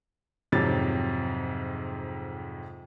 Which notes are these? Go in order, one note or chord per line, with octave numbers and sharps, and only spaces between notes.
F2 G#2 C3 F#3 G4 A6